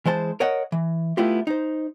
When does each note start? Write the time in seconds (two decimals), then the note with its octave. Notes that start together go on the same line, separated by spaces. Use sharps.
0.06 E3 G#3 C5 A5
0.40 A#4 C#5 D#5 F#5
0.72 E3
1.17 A3 B3 E4 F4 G4
1.47 D#4 C5